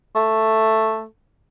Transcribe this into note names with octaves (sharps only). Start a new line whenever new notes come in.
A3